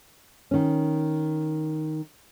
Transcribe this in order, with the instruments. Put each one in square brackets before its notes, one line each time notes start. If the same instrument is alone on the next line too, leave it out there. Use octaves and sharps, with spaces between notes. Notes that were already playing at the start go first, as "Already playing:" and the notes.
[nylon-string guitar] D#3 C#4